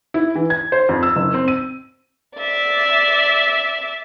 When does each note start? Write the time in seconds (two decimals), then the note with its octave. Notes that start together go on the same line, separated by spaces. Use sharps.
0.14 E4
0.35 E3
0.50 G#6
0.72 C5
0.89 F2
1.03 E6
1.16 F#1
1.34 C4
1.48 D#7
2.37 D5 E5